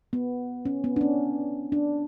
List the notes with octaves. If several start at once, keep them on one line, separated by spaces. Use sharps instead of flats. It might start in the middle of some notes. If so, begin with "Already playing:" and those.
B3
C#4
B3
D4
C#4
D4